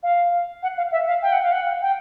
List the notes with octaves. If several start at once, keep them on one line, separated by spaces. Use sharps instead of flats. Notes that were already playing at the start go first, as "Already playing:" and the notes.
F5
F#5
F5
E5
F5
G5
F#5
F5
F#5
G5